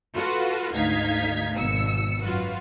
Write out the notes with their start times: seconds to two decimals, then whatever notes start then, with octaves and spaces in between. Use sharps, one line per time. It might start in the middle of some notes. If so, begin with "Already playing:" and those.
0.15 F4 F#4 A4 B4
0.74 G#1 D2 D#4 F5 G#6 B6
1.57 G#1 B2 E6 C#7
2.23 F#2 F4 F#4 B4